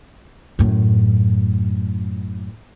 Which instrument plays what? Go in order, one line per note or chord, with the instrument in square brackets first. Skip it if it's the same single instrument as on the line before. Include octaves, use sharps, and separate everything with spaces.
[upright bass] F#2 A2